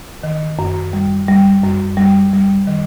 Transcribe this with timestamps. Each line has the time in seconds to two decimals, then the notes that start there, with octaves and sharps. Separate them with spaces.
0.23 D#3
0.59 F#2
0.93 G3
1.28 G3
1.63 F#2
1.97 G3
2.33 G3
2.67 D#3